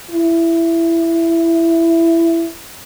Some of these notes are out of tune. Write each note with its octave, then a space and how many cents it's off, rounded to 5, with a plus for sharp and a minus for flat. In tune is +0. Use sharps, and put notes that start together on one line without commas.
E4 +10